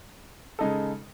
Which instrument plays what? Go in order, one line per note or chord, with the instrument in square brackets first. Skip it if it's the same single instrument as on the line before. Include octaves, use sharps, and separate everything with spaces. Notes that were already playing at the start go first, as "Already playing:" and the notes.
[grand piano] C#3 G#3 D#4 A4